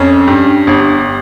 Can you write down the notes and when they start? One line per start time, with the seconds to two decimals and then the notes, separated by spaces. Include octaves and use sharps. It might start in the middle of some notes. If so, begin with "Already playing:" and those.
Already playing: F2 C#4
0.27 G2
0.67 G1